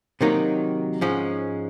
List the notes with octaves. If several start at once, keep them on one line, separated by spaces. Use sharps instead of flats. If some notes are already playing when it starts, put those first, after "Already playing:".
C3 D#3 F#3 A#3 D#4
G#2 F3 G#3 C#4